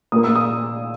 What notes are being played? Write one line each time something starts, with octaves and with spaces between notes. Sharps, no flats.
A#2 A#3 D#6
E6
D#6